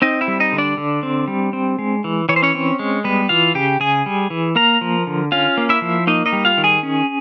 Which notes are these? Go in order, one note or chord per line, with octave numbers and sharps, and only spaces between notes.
C4 D#4 D#5
E4 E5
G3
D#4 D#5
D3
D4 D5
D3
C4
G3
C4
G#3
E3
E3 C#5
C5
C#4 C#5
C4
G#3
G3 B3 B4
E3 F4 F5
C#3 G4 G5
C#3 G#4 G#5
G3
E3
A#3 A#4 A#5
F3
D3
C#4 F4 F5
A#3
E4 E5
F3
A#3 D#4 D#5
D#4 D#5
G3
F4 F5
D#3
G#4 G#5
C#4